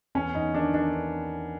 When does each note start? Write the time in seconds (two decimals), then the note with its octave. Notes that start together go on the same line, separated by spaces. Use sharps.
0.15 E2 C#4
0.35 E2 D#4
0.54 D#3 D4
0.73 D#3 D4